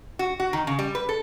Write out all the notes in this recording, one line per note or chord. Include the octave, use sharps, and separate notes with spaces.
F#4
F#4
D#3
C#3
G3
B4
A4